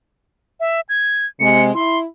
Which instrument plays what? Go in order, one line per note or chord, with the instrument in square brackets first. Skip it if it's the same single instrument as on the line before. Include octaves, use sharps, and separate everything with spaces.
[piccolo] E5
G#6
[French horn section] C3 G#3 [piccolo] C#7
[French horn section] E4 [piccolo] C6